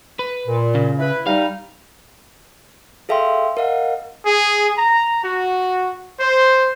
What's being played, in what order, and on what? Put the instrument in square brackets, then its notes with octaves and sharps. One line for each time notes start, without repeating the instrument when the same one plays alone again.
[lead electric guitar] B4
[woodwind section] A#2
[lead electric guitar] C#3
[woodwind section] E4 B4
[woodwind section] G3 D#4 [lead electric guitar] F5
[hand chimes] G#4 A4 E5 F5 G5 C6
A#4 D#5 F5 F#5
[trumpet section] G#4
A#5
F#4
C5